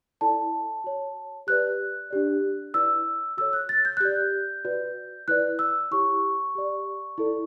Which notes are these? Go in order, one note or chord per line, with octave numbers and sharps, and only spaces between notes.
E4 A4 D5 A5
F#4 C#5
G4 B4 D5 F#6
D4 G4 D5
E4 B4 D5 E6
F#4 A4 C#5 E6
F#6
A6
G6
F#6
G4 D5 G6
F#4 B4 D5
E4 B4 D5 F#6
E6
E4 G4 C#5 C#6
G4 D5
E4 A4 D5